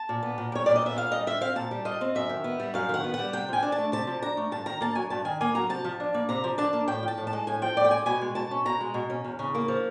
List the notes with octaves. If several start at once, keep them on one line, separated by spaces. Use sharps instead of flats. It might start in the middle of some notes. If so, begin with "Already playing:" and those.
Already playing: A5
A#2
B3
A#2
G3 C#5
A#2 D5
D#5
B3 E5
A#2 F5
G3 D#5
F4 E5
C4 F5
A#2 A5
G3
F4 D#5
C4
F#2 E5
D#3
B3
G3
F#2 F5
D#3 F#5
B3
F#5
G3
C3 G5
F3 G#5
D4
A5
A3
C3 A5
F3
D4 A#5
A3
G2 A5
D#3 A#5
A#3 A5
F#3 G#5
G2 A5
D#3 G#5
A#3 G#5
F#3 A#5
C3 A5
F3
D4
A#3
C3 A#5
F3
D4 A5
A#3
A2 G5
F3
A5
A2
A5
G#3
A2 G#5
F3 G5
A2 D5
G5
G#3 G#5
B2 G#5
G#3
B2 A5
C#4
B2 A#5
G#3
B2
C#4
E2
C#3
A#3
F3